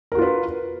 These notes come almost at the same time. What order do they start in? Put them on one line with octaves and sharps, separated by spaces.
A#4 F#4 F4 B4